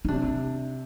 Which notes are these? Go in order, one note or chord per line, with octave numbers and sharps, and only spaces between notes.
D#4
C3 D4